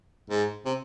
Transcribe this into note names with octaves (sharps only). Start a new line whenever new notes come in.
G#2
C3